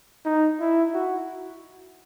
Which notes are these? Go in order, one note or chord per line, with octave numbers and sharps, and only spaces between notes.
D#4
E4
F#4